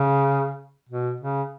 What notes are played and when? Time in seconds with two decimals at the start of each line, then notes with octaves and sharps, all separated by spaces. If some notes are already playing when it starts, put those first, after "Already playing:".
Already playing: C#3
0.89 B2
1.20 C#3